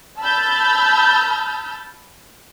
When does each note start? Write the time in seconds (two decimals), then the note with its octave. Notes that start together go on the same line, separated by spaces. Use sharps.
0.21 A5 B5 E6 F6 G6 A6